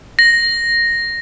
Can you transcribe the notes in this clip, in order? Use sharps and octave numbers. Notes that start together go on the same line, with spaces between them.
A#6